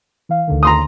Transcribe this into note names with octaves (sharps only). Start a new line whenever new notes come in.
E3 F5
D2 D3 D#3
A#5 C6 D#6